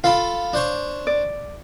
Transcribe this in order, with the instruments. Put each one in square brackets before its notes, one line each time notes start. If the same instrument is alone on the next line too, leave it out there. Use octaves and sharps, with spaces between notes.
[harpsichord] F4 A4 B5 [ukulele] F5
[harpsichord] D4 C5 C#5
[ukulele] D5